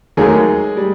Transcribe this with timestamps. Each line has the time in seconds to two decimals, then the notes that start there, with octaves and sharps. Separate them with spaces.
0.17 D#2 D#3 F#3 G#3 A3 G#4
0.77 G3